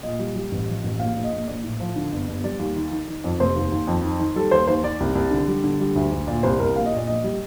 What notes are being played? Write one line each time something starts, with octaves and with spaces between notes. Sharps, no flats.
A#2 D#5
G3
G3
A1
F3
A1
A#1 F5
A#1
D#5
A#1
A#1 D5
A2
F3
D3
G1
G1
G3 D5
D#2
D#3
D#3
D#3
F2
F1 C5
D#2
D#2
F2
D#3
D#3
G3 A4
D#2 C5
D#2 C5
D#3 D5
C2
C2
D3
G3
D3
G3
D2
D2
A#2 D5
C2 C5
C2 A#4
A#1 F5
D#5
A#2 D5
A#1 D#5
G3